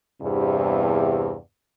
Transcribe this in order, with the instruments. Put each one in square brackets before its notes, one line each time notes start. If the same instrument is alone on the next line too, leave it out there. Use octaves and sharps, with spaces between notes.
[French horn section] E2 G2 C3